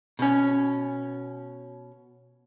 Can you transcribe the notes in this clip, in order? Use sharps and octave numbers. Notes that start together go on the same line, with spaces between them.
B2 C#4